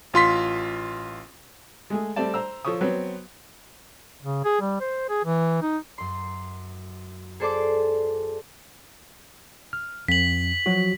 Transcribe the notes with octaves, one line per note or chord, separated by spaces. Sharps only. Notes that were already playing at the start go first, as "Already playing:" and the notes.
A1 F4 C6 B6
G#3 A3 G#4
G3 A3 C4 D5 A5
C5 A#5 E6
F3 A4 C#5 C#6 D#6
F#3 B3 C4 B4
C#3
G#4
G3
C5
G#4
E3
D#4
F#2 C6
G#4 A4 C5 D5 A5 D6
F6
F2 B6 F#7
F3 F#3 F#4